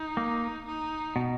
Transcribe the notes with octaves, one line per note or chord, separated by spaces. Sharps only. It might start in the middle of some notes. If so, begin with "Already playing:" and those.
Already playing: D#4
A#3
D#4
B2